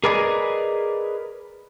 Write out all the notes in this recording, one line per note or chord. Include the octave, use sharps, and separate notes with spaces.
G#4 A#4 B4 D5 D#5 G#5